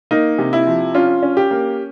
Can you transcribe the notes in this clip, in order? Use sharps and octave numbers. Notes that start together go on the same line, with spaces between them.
A#3 D#4
C3
E4
F3
C#4 F4
C#4
G4
A#3